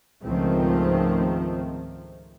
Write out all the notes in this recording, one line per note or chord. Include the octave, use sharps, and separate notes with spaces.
C#2 G#2 D#3 F3 A3 C4